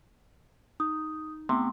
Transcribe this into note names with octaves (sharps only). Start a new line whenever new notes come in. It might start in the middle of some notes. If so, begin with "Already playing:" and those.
D#4 D#6
C3 A3 B3 C4 C6